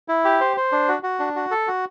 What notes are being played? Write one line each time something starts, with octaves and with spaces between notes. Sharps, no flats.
E4
G4
C5
C5
D4
F#4
F#4
D4
F#4
A4
F#4